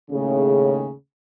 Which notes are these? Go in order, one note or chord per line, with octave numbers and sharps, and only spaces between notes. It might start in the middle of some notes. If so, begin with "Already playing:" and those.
D#2 A2 C#3